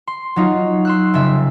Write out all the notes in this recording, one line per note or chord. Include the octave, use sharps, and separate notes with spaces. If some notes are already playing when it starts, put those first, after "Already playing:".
C6
F#3 D#4 F4
C6 E6 F#6
F1 C#3 E5